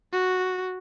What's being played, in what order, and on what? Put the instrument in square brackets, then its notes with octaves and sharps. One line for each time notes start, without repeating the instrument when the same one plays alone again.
[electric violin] F#4